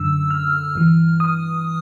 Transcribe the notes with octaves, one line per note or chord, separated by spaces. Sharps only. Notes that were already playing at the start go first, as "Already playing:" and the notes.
Already playing: F#2 D3 E6
F6
G2 E3
D#6